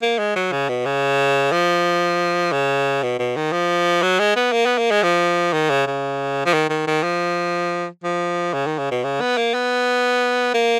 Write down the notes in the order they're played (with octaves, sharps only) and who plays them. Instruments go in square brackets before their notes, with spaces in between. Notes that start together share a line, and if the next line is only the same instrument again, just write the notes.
[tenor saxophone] A#3
G#3
F#3
C#3
B2
C#3
F3
C#3
B2
B2
D#3
F3
F#3
G#3
B3
A#3
B3
A#3
G#3
F3
D#3
C#3
C#3
F3
D#3
D#3
D#3
F3
F3
C#3
D#3
C#3
B2
C#3
B3
A#3
B3
A#3